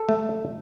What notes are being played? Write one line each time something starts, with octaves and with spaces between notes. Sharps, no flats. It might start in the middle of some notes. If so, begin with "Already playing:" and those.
Already playing: A4
A3